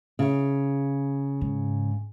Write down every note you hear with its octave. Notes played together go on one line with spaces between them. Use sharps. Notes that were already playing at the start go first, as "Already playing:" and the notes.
C#3
G#2